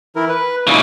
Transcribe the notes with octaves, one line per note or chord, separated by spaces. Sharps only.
E3 E4 A#4
B4
A#2 C#3 D#4 E4